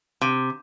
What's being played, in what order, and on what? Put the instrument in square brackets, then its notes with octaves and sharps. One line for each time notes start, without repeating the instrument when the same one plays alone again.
[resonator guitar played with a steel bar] C3